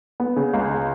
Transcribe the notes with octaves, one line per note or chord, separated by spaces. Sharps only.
B3
C#3
C#2
C#3